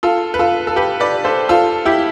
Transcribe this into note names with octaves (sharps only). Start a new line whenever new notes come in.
F4 A4
B4
F4 A4
A4
G4 B4
B4 D5
A4 C5
F4 A4
E4 G4